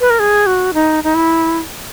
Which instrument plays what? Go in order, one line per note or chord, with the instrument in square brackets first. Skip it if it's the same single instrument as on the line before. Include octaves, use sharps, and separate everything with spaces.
[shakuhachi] B4
A#4
G#4
F#4
D#4
D#4
E4